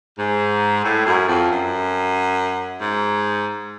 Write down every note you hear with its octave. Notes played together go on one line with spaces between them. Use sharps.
G#2
A2
F#2
F2
F#2
G#2